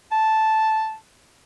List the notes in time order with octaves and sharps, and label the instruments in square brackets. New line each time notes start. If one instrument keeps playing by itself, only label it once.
[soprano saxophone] A5